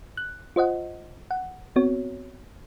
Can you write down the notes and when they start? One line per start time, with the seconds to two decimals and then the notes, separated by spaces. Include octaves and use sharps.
0.17 F#6
0.56 F4 C5 D#5 F#5
1.31 F#5
1.76 B3 C4 F#4 C#5